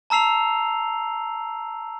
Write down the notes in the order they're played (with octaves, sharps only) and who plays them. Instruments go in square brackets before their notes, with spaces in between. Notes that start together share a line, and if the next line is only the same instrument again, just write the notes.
[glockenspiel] A5 A#5 E6 C7 F7